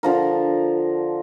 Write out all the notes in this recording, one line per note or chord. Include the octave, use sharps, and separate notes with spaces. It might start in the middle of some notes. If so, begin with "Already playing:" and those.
D3 F3 A#4